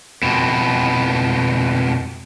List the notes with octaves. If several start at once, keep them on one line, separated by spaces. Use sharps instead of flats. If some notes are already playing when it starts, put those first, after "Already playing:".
F2 B2